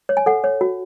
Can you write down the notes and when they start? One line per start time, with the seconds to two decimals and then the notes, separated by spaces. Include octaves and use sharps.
0.09 C#5
0.17 G#5
0.26 A4 F#5
0.44 C#5
0.61 F#4